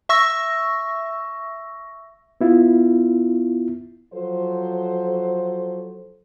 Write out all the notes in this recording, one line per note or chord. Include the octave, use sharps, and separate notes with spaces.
E5 C#6 E6 A#6
B3 E4 F4
F3 F#3 A4 C5